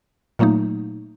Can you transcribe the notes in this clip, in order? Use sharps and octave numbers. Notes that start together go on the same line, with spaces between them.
A#2 F#3 A3 A#3 D#4